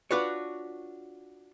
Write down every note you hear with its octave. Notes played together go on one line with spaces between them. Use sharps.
D4 F4 F#4 B4 C#5